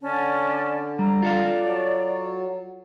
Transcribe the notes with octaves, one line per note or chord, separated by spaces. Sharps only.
D3 C#4 D5 A5
G3 A#5
F4 A4 D5 F5
F#3